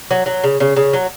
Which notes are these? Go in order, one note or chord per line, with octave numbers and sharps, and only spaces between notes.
F#3
F#3
C#3
C#3
C#3
F#3